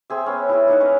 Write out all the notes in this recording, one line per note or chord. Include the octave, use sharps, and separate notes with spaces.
C4 G#4 E5
B3 C#4
E4 G#4
A#3 D#4 F#5
C#4 B4 A#5